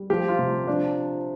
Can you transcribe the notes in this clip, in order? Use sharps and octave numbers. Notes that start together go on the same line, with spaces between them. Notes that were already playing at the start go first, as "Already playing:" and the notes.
Already playing: G3
F3 G4
F4
C3
F3 D4